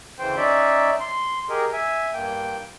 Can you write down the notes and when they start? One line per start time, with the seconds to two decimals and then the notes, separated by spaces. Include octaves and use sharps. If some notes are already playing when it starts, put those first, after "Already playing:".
0.19 D2 C#3 E3 C5 G5
0.37 C#4 D#4 D5 E5
1.00 C6
1.49 G4 G#4 A#4 D#5
1.73 E5 G#5
2.13 G2 A#3 G5